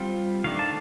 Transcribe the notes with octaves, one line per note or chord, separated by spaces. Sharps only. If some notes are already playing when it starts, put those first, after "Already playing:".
Already playing: G3 C4 F4
D#3 A3 D4 F5
A5